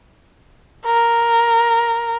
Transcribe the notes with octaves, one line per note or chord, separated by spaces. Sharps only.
A#4